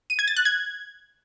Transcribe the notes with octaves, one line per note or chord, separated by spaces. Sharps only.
D#7
G#6
A6
F#6
G#6